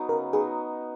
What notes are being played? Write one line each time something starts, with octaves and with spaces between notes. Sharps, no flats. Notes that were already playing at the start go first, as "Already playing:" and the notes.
Already playing: F#3 B3 D#4
C#3 A#4
F#3 B3 D#4 G#4